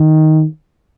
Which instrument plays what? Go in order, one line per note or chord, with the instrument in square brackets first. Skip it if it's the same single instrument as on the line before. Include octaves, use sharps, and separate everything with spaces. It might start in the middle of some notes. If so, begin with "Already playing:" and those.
Already playing: [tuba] D#3